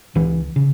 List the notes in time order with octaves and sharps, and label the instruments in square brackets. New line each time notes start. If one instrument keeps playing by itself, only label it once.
[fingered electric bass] C#2 E3
C#3